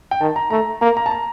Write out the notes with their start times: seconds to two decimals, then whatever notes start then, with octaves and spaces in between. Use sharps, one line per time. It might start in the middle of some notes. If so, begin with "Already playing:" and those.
0.11 G5
0.21 D#3 A5
0.36 A#5
0.50 A3 A#5
0.81 A#3 A#5
0.97 A#5
1.06 A5
1.11 A#5